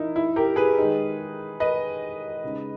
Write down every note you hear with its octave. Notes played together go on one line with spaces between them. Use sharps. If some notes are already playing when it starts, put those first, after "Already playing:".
Already playing: E3 D#4 E4 A#4
E4
G4 A#4
G#4 B4
D#3 G#3 D#4
B4 D#5
C#3 G#3 D#4